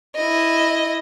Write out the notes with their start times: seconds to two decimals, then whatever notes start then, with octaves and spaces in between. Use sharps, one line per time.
0.16 E4 D#5